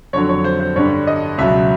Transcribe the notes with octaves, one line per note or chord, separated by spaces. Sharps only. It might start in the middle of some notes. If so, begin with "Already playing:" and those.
F2 D3 F#3 C#5
C#5
C5
C5
G2 D3 G3 C#5
D#5
C#2 B2 F#3 E5